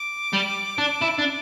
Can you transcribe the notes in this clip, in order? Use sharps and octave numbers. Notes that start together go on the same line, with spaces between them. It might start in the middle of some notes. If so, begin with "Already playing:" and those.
Already playing: D6
G3
D4
E4
D4